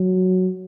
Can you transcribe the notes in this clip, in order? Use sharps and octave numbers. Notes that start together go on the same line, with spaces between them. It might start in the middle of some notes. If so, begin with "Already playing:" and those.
Already playing: F#3